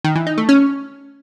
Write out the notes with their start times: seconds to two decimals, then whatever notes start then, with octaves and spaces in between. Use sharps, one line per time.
0.04 D#3
0.16 E3
0.27 D#4
0.38 A3
0.49 C#4